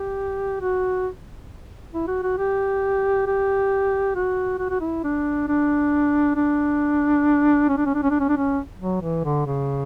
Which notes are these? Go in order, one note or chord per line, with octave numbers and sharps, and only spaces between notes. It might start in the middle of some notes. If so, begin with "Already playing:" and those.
Already playing: G4
F#4
E4
F#4
F#4
G4
G4
F#4
F#4
F#4
E4
D4
D4
D4
C#4
D4
C#4
D4
C#4
D4
C#4
D4
C#4
F#3
E3
D3
C#3